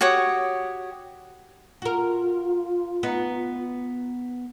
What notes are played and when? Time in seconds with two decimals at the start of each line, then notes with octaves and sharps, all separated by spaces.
0.01 F#4 G4 C#5 D#6
1.82 F4 F#4 A#4
3.03 B3 D#4